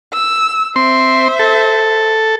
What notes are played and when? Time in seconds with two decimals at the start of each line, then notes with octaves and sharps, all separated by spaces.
0.13 E6
0.76 C4 C5 E5 C6
1.39 A4